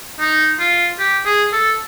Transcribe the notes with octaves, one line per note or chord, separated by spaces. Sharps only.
D#4
F4
G4
G#4
A4